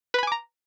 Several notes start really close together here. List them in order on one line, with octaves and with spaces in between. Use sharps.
B4 B5 G#5 D6 A#5